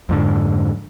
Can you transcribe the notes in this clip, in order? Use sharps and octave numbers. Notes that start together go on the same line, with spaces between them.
F2 G#2 D3